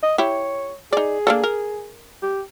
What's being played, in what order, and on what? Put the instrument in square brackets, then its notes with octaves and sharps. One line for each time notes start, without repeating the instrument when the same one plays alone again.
[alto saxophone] D#5
[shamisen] E4 G4 [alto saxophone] C#5
[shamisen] D#4 D5 [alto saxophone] G#4
[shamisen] A#3 D4 A4
A#4
[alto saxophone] G4